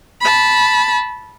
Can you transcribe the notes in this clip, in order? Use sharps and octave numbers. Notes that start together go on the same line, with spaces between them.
A5 B5